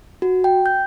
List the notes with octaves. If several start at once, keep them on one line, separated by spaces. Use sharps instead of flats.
F#4
G5
G6